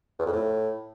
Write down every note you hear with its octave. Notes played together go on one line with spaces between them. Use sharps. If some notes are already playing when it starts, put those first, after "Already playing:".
E2
F2
A2